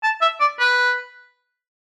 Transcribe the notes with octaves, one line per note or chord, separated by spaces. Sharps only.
A5
E5
D5
B4